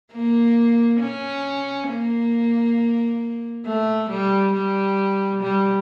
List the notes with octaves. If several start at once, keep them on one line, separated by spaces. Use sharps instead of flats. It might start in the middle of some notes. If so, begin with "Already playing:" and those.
A#3
C#4
A#3
A3
G3
G3
G3